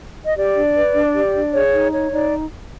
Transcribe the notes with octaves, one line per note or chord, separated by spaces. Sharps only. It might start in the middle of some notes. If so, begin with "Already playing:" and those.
D#5
G4 D5
D4
B4
D4
G4
D4
G#4 C#5
D#4
C#5
D#4 D5